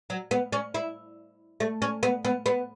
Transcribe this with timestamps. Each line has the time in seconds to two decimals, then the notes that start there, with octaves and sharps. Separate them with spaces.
0.10 F#3
0.31 B3
0.52 C#4
0.74 E4
1.60 A3
1.82 C#4
2.03 B3
2.25 B3
2.46 B3